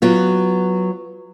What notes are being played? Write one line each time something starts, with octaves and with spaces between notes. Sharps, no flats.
F#3 B3 F4